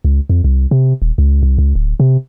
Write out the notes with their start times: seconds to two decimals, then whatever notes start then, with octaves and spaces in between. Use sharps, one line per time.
0.05 C#2
0.30 F2
0.44 C2
0.71 C3
1.02 D#1
1.18 C#2
1.43 C2
1.58 C#2
1.75 D1
2.00 C3